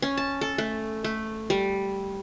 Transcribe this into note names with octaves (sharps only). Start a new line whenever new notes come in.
C#4
A5
A4
A3
A3
G3